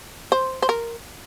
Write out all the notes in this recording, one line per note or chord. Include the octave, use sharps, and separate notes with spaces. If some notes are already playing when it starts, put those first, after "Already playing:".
C5
C5
A#4